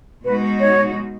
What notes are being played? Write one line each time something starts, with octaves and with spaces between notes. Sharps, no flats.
B2 G#3 D#4 F#4 B4
C#5